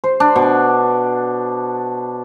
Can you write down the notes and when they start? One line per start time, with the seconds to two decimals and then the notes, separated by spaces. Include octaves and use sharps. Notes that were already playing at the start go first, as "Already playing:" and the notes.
0.04 C5
0.20 D4
0.36 B2